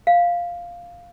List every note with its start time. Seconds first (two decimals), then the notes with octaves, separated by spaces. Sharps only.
0.07 F5